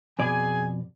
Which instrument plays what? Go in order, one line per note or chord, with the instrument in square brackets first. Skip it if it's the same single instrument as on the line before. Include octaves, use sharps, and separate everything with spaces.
[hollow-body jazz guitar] F2 B2 D5 [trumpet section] G#4 G#5